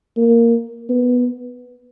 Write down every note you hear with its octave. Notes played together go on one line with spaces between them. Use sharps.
A#3
B3